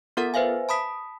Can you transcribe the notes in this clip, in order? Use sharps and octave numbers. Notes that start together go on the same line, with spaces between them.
B3 F4 A4 A#4 F#5 A6
B4 C5 E5 F5 G#5
A5 B5 D#6 B6